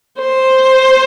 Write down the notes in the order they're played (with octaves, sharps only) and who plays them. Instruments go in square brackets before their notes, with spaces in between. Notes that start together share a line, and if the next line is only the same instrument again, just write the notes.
[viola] C5